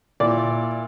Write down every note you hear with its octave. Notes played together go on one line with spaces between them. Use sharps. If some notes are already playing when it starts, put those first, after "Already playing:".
A#2 E4 D5 D6